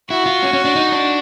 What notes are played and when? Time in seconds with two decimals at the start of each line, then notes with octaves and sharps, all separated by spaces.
0.10 E4 F#4
0.26 F4
0.43 C#4
0.53 C#4
0.65 D4
0.76 D#4
0.92 D4